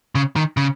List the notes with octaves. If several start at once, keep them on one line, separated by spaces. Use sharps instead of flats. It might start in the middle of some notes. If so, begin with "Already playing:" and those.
C#3
D#3
C#3